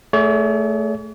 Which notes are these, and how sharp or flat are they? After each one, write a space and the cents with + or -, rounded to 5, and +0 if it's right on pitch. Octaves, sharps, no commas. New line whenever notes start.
A3 +0 G#4 +20 C#5 +45